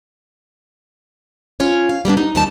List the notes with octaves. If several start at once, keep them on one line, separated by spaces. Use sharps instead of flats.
C#4 F4 C#5
F5
G3 A#3 B3 D4
D#4
D#2 C#3 G3 D#4 A5